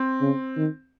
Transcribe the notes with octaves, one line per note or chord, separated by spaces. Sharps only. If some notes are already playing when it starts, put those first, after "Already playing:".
Already playing: C4
C#3
D#3